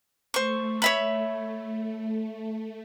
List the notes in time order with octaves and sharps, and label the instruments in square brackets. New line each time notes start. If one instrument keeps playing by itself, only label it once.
[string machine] A3 [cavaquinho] C5 C#6
[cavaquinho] C#5 E5 B5